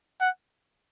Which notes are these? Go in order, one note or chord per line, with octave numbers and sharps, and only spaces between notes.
F#5